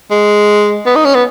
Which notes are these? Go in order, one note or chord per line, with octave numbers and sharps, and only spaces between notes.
G#3
B3
D#4
C#4
B3